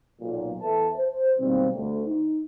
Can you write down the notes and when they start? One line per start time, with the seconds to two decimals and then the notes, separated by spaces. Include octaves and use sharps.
0.21 B1 A#2
0.61 E2 A4 B4 E5 A5
0.96 C5
1.39 B2 D#3 F#3 G3 A#3 C4
1.74 D2
2.06 D#4